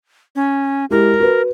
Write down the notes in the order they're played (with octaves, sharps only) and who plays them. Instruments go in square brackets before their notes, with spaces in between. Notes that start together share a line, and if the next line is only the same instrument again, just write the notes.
[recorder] C#4
[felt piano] G#3 E4 G4 [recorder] A#4
[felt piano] F#4 B4